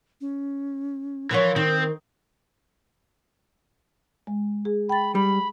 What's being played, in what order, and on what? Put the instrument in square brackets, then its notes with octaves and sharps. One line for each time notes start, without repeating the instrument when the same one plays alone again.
[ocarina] C#4
[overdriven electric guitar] E3 [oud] F3 F4 C#5 [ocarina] A#4
[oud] D#3 [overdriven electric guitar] C4
[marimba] G#3
G#4
[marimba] G5 A6 [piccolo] B5
[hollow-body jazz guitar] G3 [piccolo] B5